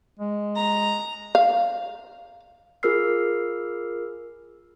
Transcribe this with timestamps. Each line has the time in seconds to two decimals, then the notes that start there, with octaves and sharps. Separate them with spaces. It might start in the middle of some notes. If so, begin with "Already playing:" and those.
0.19 G#3
0.56 A#5
1.35 F5
2.83 F4 G#4 A#4 E6 F6 C7